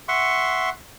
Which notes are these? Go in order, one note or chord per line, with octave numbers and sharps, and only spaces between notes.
E5 F#5 C6 C#6